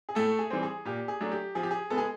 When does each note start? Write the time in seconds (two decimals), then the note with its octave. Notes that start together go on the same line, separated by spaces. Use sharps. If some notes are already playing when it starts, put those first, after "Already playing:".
0.09 G#4
0.15 A2 A3 A4
0.39 G#4
0.50 E3 G3 C4
0.63 G#4
0.85 A#2 G4
1.08 G#4
1.20 F#3 A3 D4
1.32 G4
1.55 F3 G#4
1.63 G4
1.71 G#4
1.90 G#3 B3 A4
1.98 G#4